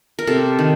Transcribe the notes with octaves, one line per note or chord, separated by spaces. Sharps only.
A#4
C3 A4
D#3